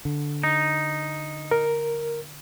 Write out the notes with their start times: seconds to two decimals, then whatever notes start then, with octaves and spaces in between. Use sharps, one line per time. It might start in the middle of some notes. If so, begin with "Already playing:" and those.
0.05 D3
0.43 D#4
1.51 A#4